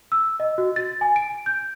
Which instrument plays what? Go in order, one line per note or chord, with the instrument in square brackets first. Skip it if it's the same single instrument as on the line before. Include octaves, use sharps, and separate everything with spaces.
[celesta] E6
D#5
F#4
A6
G#5
D7
G6